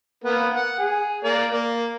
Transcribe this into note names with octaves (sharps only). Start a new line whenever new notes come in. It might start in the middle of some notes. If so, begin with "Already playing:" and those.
A#3 B3
F#5
G#4
A#3 A#4 D5
A#3